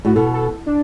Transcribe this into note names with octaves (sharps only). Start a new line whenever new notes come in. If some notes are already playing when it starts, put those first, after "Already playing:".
A2 F#4
B2 A4
A4
D4